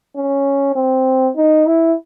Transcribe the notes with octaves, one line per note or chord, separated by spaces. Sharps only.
C#4
C4
D#4
E4